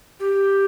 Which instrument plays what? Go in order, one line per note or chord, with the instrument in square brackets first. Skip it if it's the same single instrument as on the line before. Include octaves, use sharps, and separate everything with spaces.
[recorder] G4